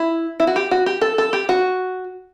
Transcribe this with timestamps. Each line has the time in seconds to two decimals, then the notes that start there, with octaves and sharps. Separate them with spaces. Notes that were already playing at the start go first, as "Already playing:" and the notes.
Already playing: E4
0.40 E4
0.47 F#4
0.56 G4
0.71 F#4
0.86 G4
1.01 A4
1.18 A4
1.33 G4
1.49 F#4